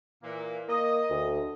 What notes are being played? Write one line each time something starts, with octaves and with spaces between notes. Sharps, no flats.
A#2 E3 A#3
A#3 D#5
D2